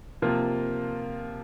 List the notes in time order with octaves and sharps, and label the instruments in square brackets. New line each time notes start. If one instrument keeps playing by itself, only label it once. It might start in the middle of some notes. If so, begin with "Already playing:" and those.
[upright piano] C3 F3 A#3 F4